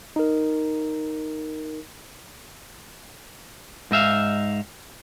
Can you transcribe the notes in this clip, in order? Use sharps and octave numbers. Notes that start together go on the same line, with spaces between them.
D#4 A#4
G#2 D#4 E5 F5